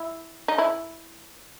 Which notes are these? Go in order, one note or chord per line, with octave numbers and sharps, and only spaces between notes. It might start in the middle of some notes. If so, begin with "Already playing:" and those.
Already playing: E4
D#4
E4